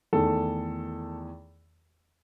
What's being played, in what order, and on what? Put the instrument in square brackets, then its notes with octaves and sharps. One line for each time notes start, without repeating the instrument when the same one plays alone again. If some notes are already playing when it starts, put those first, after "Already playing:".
[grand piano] E2 D#3 A3 A4